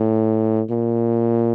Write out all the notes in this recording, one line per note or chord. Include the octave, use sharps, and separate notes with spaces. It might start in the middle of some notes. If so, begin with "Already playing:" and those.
Already playing: A2
A#2